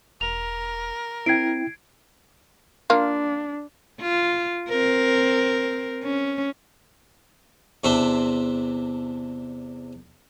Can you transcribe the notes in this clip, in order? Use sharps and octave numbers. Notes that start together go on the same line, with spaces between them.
E1 A#4 F7
C4 E4 G5 G#6 C7 D7
A#3 D4 F4
F4
C4 A#4
C#4
E2 C3 C4 D4 E5 C6